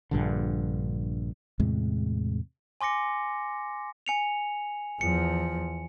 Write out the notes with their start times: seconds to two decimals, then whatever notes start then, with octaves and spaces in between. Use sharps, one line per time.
0.11 A#1 G2 D3
1.60 E2 A2 C3 G#3
2.81 G#5 C6 D6 A#6 C#7
4.06 G#5 C#7 F7
5.01 E2 F3 C#7